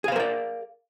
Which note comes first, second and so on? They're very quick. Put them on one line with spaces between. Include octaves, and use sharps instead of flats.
G#4 F5 C5 A#4 D5